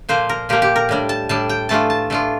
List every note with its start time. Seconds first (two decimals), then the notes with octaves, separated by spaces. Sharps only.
0.09 A#2 F3 A#3 C5
0.29 A#4
0.49 A#2 F3 A#3 G4
0.62 G4
0.76 A#4
0.89 A2 G3 D4
1.09 A5
1.29 A2 G3 D4 A5
1.49 G5
1.69 E3 A3 D4 F4 A5
1.90 A5
2.10 E3 A3 D4 F4